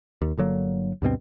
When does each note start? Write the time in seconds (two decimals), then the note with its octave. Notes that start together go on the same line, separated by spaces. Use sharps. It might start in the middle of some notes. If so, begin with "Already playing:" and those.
0.22 D#2
0.37 G1 D3 F#3 A#3
1.02 D2 G2 B2 C4